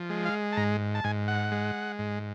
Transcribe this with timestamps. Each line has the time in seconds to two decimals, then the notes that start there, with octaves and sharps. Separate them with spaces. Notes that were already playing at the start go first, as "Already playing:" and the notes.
Already playing: F3
0.09 G#3
0.25 F5
0.52 A5
0.57 G#2 A#5
0.95 A5
1.04 G#2 G#5
1.28 F#5
1.52 G#3
1.99 G#2